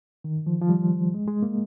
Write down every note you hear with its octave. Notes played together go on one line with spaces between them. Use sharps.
D#3
F3
F3
G3
G#3
G#3
A#3